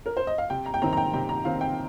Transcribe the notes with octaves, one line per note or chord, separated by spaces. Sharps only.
A#4
C5
D#5
F5
C3 G5
A#5
G5
D#3 C4 A#5
A#5
G5
C3 G5
A#5
D#3 C4 F5
G5